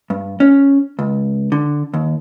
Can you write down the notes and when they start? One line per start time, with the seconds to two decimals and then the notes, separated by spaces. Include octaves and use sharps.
0.10 G2
0.40 C#4
0.99 C#2
1.52 D3
1.94 D#2